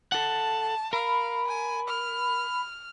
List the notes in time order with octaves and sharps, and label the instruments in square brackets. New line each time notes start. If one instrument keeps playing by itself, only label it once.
[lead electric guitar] A4 F#5 [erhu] A5
[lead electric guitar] A#4 [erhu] F5 [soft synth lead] B5
[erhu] G#5
F6